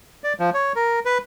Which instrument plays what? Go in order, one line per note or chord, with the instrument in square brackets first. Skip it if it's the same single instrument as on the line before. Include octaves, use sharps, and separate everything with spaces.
[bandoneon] D5
F3
C#5
A#4
B4